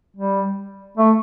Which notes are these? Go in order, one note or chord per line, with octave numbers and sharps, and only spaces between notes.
G3
A3